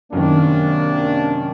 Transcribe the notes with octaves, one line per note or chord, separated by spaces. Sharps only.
F#2 C3 D#3 A#3 D4